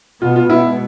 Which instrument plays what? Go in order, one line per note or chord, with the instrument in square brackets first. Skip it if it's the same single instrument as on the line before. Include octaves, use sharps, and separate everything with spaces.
[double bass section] B2 B3 [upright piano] F4
[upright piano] F4
[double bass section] B2 G#3 B3 [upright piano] E4